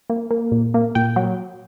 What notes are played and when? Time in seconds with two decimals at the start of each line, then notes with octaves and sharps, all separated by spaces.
0.10 A#3
0.31 A#3
0.52 A#2
0.74 A#3
0.95 A#2 G5
1.16 F#3 F#5